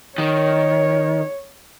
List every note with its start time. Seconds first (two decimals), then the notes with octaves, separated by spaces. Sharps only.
0.18 D#3 C#5